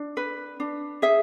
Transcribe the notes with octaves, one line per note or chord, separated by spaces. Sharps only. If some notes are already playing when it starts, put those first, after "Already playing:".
Already playing: D4
B4
D4
G#4 E5